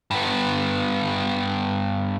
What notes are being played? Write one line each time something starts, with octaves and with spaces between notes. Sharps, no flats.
G2 B3